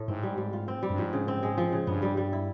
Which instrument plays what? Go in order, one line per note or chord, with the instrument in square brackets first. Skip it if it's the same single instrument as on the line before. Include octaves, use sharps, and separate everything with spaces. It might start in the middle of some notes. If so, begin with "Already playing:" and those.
Already playing: [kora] A2 A3
[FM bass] G#2 [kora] C4
[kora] G3
G3
F4
C4
G3
[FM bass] G2
[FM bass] G#2 [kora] F3
[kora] C#3
C4
G#3
F3
C#3
[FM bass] G2 [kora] B3
[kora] G3
G3
E4